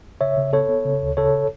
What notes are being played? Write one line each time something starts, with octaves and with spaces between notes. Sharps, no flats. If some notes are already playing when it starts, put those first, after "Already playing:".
C#3 C#5 E5
C#3
B3 A4 C#5
B3
C#3
D2
C#3 A4 C#5